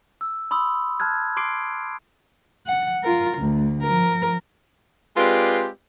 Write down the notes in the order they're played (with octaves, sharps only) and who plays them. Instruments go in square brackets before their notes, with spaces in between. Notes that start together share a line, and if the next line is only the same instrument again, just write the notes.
[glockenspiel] E6
B5 C6 D#6 E6
A5 F6 F#6 G#6
C6 D6 C7 D7
[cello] F#5
F4 A#4
D2
F3 A#4
[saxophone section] G#3 C4 F4 G4 B4 D5